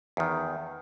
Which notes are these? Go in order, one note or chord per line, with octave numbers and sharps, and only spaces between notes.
E2 D#3